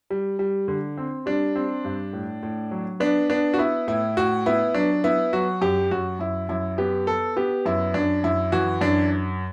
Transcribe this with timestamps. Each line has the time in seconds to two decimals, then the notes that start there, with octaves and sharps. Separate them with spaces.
0.10 G3
0.39 G3
0.68 D3
0.98 C4
1.26 G3 D4
1.56 C4
1.84 G2
2.13 A2
2.43 A2
2.71 F#3
3.00 B3 D4
3.30 B3 D4
3.54 F#4
3.58 B3 E4
3.87 A2 E4
4.17 A2 F#4
4.46 B3 E4
4.74 F#3 D4
5.04 B3 E4
5.33 F#3 F#4
5.61 F#2 G4
5.91 F#2 F#4
6.19 F#2 E4
6.49 F#2 E4
6.78 B3 G4
7.07 B3 A4
7.36 B3 G4
7.66 F#2 E4
7.94 F#2 D4
8.24 F#2 E4
8.52 E3 F#4
8.81 F#2 D4